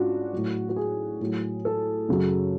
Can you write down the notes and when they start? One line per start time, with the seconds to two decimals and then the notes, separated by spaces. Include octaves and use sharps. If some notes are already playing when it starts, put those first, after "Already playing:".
Already playing: G#2 C#4 D4 F4 F#4
0.33 A2 F#3
0.69 F#4
0.76 G#4
1.21 A2 F#3
1.65 A4
2.09 F#2 C#3 F#3